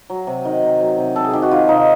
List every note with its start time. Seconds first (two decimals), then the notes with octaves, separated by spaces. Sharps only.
0.10 F#3
0.27 C3
0.45 D#3
0.63 C3
0.80 F#3
0.98 C3
1.16 C3 A4
1.25 G#4
1.33 D#3 G4
1.42 F#4
1.51 D#3 F4
1.69 C3 D#4